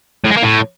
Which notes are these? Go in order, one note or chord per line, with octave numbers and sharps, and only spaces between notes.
A2
G#3
A#3
A2